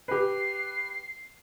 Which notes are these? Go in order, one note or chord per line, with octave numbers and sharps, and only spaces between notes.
G4 B4 C7